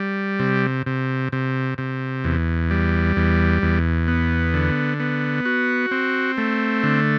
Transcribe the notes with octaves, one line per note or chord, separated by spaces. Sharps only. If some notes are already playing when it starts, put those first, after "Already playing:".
Already playing: G3
C3
C3
C3
C3
E2
G3
E2
E2
B3
D3
B3
F#4
C4
A3
D3